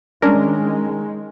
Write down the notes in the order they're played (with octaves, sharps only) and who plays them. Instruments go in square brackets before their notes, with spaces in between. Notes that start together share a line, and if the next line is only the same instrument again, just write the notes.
[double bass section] D#3 G#3 [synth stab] C#4 D4 A#4